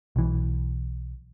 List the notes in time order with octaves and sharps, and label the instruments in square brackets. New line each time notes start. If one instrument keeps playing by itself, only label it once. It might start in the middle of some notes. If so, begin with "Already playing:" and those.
[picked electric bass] B1 E3